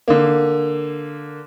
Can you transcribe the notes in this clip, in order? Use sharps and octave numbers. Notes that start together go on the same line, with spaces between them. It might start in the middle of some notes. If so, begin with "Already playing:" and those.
D3 A#3